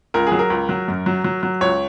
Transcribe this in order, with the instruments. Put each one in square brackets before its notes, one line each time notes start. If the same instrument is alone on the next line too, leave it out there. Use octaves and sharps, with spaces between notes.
[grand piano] C#2 A#4
F#3 G#4
A#4
C#2
F#3
F#2
F#3
F#3
F#3
C#2 C#5